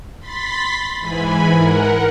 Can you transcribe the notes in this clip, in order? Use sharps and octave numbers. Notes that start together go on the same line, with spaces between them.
B5 C6 A6 B6
G#2 E3 G#5 B5
A#4 F#5